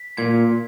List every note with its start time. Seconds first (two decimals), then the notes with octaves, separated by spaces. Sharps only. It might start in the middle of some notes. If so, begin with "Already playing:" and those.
Already playing: B6
0.18 A#2 G#6